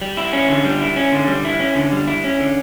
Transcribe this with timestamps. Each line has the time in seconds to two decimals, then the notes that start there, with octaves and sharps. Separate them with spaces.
0.02 G3
0.17 E4
0.33 C#4
0.49 D3
0.65 G3
0.81 E4
0.96 C#4
1.12 D3
1.28 G3
1.45 E4
1.60 C#4
1.75 D3
1.92 G3
2.07 E4
2.24 C#4
2.40 D3